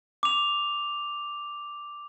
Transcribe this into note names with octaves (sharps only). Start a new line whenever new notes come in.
D6 F7